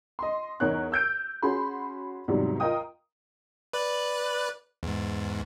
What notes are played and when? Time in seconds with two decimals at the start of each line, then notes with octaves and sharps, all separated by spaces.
0.19 D#5 C6
0.60 E2 D#4 A#4 C#5 F#6
0.92 E6 G6 D7
1.42 C#4 F#4 G#4 B5 C6
2.28 E2 G#2 C3 F#3 G3
2.60 F4 A#4 D#5 G5 D#6
3.73 B4 D5 F#6
4.83 E2 G#2